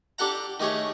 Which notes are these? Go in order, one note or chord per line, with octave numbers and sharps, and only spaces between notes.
D4 G4 A4 F#5 A#5
D#3 A3 G4 G#4 C#5